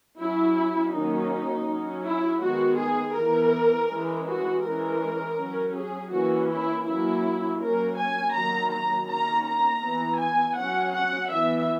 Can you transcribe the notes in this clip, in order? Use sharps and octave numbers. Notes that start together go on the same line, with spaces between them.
F#3 C#4 E4
D#3 F#3 A#3 C#4 D#4
F#3 C#4
E4
D#3 G#3 B3 F#4
G#4
E3 B3 A#4
E3 G#3 C#4
F#4
E3 G#3 C#4 A#4
F#3 C#4
G#4
E3 A#3 C#4 F#4
E4
F#3 A#3 C#4 E4
F#3 A#3 C#4 A#4
G#5
D#3 F#3 A#3 A#5
A#5
D#3 A#3 C#4 A#5
A#5
E3 B3
G#5
F#3 C#4 F#5
F#5
E3 B3 E5